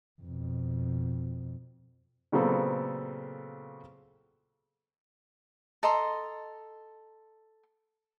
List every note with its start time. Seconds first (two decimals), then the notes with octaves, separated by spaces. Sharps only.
0.22 F2 B2
2.32 A#2 C#3 F#3 B3 C4 A4
5.83 A4 D#5 A#5 C6